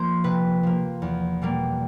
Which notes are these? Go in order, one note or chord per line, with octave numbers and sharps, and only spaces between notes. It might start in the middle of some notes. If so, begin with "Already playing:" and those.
Already playing: F3 A#3 C5
C3 B4
F3 A#3
E2
B2 G3 A#3